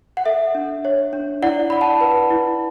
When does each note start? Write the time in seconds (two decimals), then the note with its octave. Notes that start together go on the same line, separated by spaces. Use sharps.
0.17 F#5
0.25 A4 E5
0.55 D4
0.85 C#5
1.13 D4
1.43 E4 D5 F#5
1.70 D5 B5
1.81 F#5 A5
2.01 B4
2.31 E4